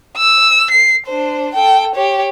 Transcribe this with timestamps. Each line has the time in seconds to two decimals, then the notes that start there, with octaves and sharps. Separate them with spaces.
0.17 E6
0.71 C7
1.06 D4 C5
1.55 A4 G5
1.96 G4 C#5